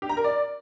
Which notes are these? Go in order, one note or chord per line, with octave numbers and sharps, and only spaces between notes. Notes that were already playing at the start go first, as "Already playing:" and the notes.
G4
A#5
A#4
D5